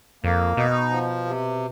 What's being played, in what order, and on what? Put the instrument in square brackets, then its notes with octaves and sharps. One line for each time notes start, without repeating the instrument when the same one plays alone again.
[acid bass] F2 [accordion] A#3
[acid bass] B2 [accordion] D#4
[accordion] F3
C3